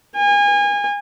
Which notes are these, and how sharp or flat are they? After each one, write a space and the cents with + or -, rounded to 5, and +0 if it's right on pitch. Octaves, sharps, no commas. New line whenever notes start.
G#5 -30